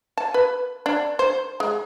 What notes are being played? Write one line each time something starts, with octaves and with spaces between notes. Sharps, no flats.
A5
B4
D4
C5
G#3